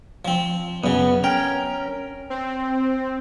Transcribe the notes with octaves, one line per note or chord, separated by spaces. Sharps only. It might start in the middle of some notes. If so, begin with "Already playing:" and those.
F3 C4
F#2 C#3 B3
C#4 A#4 G5
C4